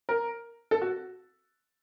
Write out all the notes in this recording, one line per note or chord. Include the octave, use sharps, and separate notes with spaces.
A#4
A4
F#4